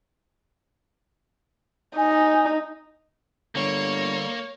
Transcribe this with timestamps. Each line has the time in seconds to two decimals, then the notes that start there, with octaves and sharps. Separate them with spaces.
1.97 D#4 G#5
3.55 G1 D3 G3 A#3 C#5